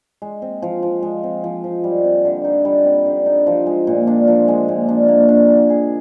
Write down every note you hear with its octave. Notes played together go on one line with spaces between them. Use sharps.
G#3
C4
F3
F3
G#3
C4
F3
F3
G3
C4
D3
D#4
G3
C4
D3
D#4
F3
G#3
A#2
D4
F3
G#3
A#2
D4
A#3
D4
D#3
G#4